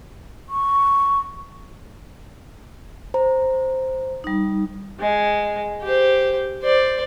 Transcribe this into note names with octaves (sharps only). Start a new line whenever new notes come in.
C#6
C5 A#5
G3 D#4
G#3
G4 C5
C5 D5